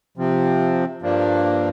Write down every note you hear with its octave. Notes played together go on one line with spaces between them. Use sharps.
C3 F3 C4
G2 F3 A#3 D4